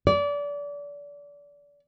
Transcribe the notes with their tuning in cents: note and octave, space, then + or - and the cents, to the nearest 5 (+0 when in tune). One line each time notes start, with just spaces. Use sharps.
D5 -30